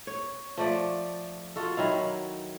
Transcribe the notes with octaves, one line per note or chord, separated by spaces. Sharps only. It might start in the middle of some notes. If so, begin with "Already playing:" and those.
C#5
F3 A3 D5
F4 F#4 A4
D#3 F#3 E4 F5